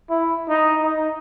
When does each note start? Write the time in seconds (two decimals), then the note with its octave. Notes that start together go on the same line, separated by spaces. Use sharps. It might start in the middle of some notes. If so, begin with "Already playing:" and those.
0.10 E4
0.49 D#4
0.83 D#4